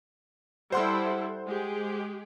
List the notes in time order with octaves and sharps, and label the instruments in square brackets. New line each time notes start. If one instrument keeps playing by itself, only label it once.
[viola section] G3 E4 A4 [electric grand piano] C5 F#5 C6
[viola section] G#3 G4 G#4